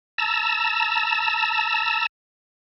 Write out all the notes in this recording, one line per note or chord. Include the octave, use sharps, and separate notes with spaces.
A5 A#5 E6